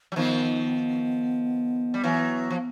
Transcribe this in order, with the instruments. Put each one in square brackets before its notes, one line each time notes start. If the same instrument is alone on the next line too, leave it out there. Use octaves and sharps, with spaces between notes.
[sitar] F#3
[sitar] D#3 F3 [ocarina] B3
[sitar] G3
E3 F#3
F3